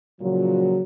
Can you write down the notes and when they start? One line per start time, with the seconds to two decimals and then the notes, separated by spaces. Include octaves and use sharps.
0.20 A#2 C#3 F3 F#3